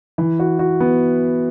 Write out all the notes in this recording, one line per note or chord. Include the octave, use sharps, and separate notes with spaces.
E3
F#4
F#4
B3